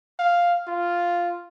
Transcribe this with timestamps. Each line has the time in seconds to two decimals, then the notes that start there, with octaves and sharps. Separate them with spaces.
0.19 F5
0.68 F4